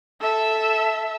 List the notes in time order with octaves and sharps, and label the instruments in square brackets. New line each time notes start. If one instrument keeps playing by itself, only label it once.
[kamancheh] A4 E5